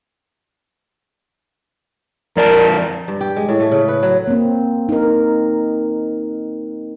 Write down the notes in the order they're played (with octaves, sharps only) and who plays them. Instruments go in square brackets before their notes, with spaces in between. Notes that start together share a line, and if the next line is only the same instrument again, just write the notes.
[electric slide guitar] F2 D5 A5 [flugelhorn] A#4
[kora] G2
G4
G#3
A2
A3
C#3
B4
F#3
[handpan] A#3 C4
D#4 A#4